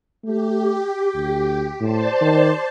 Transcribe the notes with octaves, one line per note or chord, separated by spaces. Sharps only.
A3 G4
D2
A2 C5 D5 A5
D#3